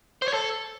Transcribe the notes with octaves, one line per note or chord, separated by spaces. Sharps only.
C5
C#5
A4